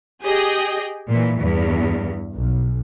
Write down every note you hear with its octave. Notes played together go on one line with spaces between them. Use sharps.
G4 G#4 D#5 G5
A#2 E3
E2 G2
B1